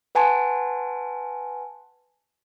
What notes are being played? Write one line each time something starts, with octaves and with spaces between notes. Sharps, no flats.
B4 F#5 G#5 A5 C6